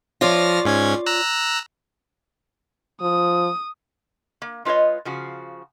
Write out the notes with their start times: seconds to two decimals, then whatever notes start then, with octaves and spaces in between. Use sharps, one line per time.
0.21 F3 F4 C#5 D5 F6 A#6
0.65 G#2 C#4 G#6
1.06 A#5 E6 F#6
3.01 F3 D#6
4.42 A#3
4.65 G#3 F4 B4 C#5 D#5
5.05 C#3 F3 F#4